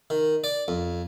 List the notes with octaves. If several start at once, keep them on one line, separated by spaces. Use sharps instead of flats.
D#3
D5
F2